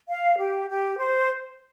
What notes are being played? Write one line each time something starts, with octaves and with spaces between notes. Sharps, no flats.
F5
G4
G4
C5